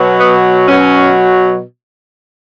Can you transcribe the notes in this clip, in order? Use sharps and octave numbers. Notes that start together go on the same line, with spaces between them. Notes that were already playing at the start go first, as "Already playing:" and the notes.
Already playing: B2 F#3
B3
B2 F#3 C#4